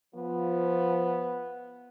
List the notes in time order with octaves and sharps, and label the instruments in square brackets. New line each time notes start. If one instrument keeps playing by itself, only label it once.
[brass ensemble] F3 [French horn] B3